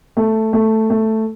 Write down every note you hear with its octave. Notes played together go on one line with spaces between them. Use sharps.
A3
A3
A3